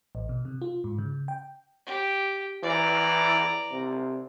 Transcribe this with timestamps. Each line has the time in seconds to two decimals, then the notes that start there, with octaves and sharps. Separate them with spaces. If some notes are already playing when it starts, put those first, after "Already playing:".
0.15 A1
0.29 B2
0.45 C3
0.62 F4
0.84 G#2
0.98 C#3
1.28 G5
1.86 G4
2.63 E3 D5 A#5
3.71 C3